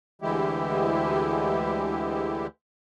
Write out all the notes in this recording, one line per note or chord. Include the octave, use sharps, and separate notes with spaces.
D2 D3 E3 G#3 E4 G4